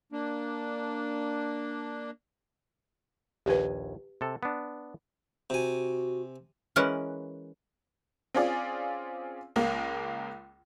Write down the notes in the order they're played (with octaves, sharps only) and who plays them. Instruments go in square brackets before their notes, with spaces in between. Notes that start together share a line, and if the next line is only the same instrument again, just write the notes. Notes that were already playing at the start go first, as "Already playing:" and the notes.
[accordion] A#3 D4
[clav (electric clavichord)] A#1 D#2 G#5 [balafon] G4 B4
[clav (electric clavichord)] C3 A4
B3 D4
[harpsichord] C3 G#5 [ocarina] F#4
[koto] E3 G#3 C#4 A#4 B4 F#5
[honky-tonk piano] C4 C#4 F4 G#4 D5
C#2 G#3 A#3